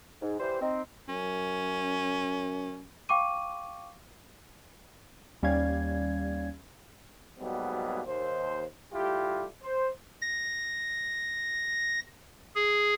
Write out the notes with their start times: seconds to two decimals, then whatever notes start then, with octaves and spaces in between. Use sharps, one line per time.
0.22 G#2
0.39 E3 G3 C5
0.61 C4 D#4
1.08 F#2 C#4
3.09 F5 G5 C#6 D6 D#7
5.43 D#2 G3 C#4 D5 F5 G#6
7.39 G#2 B2 F#3 G3 A#3 B3
8.06 D#2 C5
8.93 G3 A3 E4 F4 G4
9.63 C5
10.21 A#6
12.56 G#4